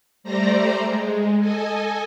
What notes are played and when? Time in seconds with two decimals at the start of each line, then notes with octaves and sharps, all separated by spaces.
0.24 G3 A3 C5 D5 A#5 A#6
0.83 G#3
1.38 A4 D#5 G#5